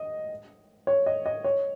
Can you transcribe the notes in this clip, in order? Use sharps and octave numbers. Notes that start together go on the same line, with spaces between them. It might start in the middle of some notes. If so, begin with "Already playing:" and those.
Already playing: D#5
C#5
D#5
D#5
C#5